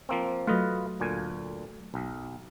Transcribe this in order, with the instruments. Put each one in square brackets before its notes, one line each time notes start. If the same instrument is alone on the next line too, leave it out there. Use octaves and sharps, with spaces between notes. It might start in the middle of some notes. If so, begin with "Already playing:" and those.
[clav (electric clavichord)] F3 A#3 C4
[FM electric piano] F#3 A3 [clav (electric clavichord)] F4 B4 D#5
[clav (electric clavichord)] D2 A#2 G#5
B1